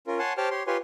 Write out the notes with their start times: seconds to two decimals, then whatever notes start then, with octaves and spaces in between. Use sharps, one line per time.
0.07 C#4 F4 A#4
0.19 C#5 F#5 G#5 A5 C6
0.38 G4 C5 C#5 G5 A5 F6
0.51 G4 C#5 C6
0.67 F4 G4 B4 C#5 G#5 C6